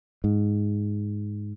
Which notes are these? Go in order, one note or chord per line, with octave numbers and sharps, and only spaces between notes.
G#2